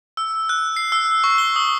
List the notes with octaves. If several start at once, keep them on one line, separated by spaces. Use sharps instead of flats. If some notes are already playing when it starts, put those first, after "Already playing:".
E6
F#6
C7
E6
C#6
G7
D#6